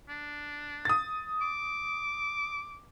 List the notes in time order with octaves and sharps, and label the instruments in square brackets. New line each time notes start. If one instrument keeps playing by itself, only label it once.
[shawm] D4
[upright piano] D#6 A6
[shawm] D6